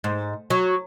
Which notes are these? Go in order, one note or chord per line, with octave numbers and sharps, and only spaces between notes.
G#2
F#3